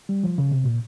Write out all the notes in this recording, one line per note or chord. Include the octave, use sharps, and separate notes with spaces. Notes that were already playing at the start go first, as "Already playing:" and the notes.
G3
F3
C#3
C3
A#2